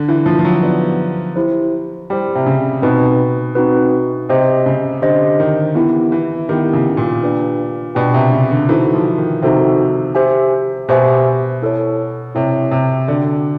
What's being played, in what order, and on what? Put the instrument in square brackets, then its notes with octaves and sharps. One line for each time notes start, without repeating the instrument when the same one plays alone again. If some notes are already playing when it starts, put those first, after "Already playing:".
Already playing: [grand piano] D3
E3
F3
F3
F#3
[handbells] B3 D#4 G4 B4 D5
E4 G4 C5
[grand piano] G3 [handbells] E4 G4 C5
[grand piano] C3
C#3
[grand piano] B2 [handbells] C4 D#4 F#4 B4
[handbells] C4 D#4 F#4 B4
[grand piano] C3 [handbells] G4 C5 D#5
[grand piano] C#3
[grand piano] D3 [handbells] G4 C5 D#5
[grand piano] D#3
[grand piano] E3 [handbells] B3 E4 G4
[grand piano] E3
[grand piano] D#3 [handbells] B3 E4 G4
[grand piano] C#3
A#2
[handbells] D4 G4 B4 D5 G5
[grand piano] B2 [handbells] D4 G4 B4 D5 G5
[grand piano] C3
C#3
D3
[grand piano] E3 [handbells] D#4 F#4 A4 C5
[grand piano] F3
D#3
[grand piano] C3 [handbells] D#4 F#4 A4 C5
[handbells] G4 C5 E5 G#5
[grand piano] B2 [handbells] G4 C5 E5 G#5
[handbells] E4 A4 C#5
[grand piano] C3 [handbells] E4 A4 C#5
[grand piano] C3
[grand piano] D3 [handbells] F#4 A4 D5 G5